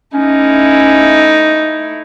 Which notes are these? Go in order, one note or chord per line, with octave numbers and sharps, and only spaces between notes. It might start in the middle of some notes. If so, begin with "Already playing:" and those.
A3 C#4 D#4 E4